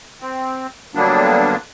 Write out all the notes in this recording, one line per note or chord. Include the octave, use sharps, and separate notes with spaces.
C4
D3 F#3 G3 A#3 B3 D4